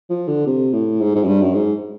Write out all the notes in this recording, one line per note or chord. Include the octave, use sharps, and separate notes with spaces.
F3
D3
C3
A2
G#2
G#2
F#2
G2
F#2
G#2